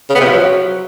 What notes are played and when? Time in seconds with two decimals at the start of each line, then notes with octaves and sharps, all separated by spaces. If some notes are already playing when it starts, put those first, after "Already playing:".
0.10 C#3
0.15 B3
0.20 C3
0.25 F3
0.30 F#3